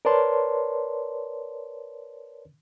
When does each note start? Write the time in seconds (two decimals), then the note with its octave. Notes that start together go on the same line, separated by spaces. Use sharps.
0.05 A#4 B4 C#5 D5 A5 C6